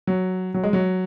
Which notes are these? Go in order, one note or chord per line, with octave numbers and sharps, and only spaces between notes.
F#3
F#3
G#3
F#3